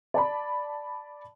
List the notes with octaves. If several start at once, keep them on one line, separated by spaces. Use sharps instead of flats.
D5 A5 B5